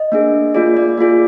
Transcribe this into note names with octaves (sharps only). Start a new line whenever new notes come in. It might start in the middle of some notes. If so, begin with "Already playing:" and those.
Already playing: D#5
A#3 D4 G#4
A#3 F4 G#4 D5
D5
A#3 F4 G#4 D5